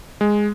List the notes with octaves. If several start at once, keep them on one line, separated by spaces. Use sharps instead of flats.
G#3